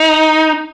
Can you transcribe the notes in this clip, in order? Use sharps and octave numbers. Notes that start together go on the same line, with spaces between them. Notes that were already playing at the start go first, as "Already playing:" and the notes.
Already playing: D#4